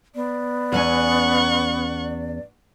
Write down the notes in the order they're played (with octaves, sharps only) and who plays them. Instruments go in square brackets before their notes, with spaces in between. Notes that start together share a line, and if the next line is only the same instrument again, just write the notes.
[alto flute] B3 [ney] D5
[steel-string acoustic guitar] E2 C#4 G#5 [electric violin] F#5 C#6